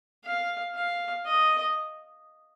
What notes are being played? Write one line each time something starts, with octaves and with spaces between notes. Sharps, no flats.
F5
F5
D#5